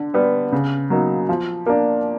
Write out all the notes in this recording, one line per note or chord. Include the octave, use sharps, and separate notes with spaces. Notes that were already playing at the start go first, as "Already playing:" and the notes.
Already playing: D3
G3 B3
C#3
F#3 A#3 D#4
F3
A#3 D4